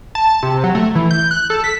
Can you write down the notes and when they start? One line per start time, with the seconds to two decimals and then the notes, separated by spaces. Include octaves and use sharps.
0.15 A5
0.27 A5
0.43 C3
0.64 F#3
0.75 A3
0.95 E3
1.11 G6
1.31 F#6
1.50 A4
1.64 B6